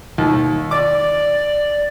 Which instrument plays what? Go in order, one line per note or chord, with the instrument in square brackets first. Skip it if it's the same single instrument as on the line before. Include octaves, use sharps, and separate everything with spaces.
[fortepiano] D#2
[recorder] D5 [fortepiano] D6